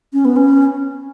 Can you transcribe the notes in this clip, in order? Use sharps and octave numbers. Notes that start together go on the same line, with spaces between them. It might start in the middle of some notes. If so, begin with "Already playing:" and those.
C#4
B3
C#4